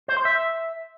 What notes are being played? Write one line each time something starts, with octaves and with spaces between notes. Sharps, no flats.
C5
C6
E5